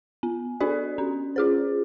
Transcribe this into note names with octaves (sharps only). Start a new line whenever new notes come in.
B3
D4 F#4 A4 D5
C#4
F4 G#4 C5